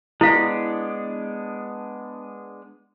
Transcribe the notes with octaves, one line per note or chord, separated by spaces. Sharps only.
G#3 B3 D4 E4 F5